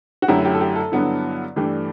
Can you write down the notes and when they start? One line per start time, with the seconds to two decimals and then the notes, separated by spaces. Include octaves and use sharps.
0.22 F#4
0.28 F#2 D3 F#3 A3 E4 G4
0.45 G4
0.54 A4
0.60 G4
0.76 A4
0.92 G2 D3 F#3 B3 E4
1.56 G2 E3 A3 D4 G4